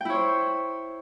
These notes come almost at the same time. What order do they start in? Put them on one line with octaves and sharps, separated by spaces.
G5 E4 C#5 C5